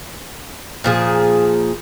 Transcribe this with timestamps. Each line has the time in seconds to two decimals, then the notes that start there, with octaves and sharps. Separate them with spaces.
0.84 A#2 F3 G#4